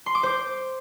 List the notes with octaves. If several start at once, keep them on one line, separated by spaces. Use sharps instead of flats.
C6
D6
C5